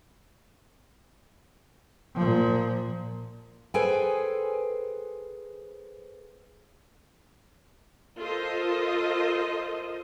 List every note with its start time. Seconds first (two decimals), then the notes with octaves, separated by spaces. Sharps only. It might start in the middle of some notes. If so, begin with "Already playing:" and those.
2.15 A#2 F3
3.74 G#4 A4 B4 C5 G5 G#5
8.20 F4 A4 A#4 C5 D#5